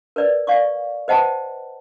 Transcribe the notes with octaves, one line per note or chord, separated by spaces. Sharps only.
A#4 B4 D5
D5 F5 C#6 D6
B4 C5 D#5 F#5 G5 A5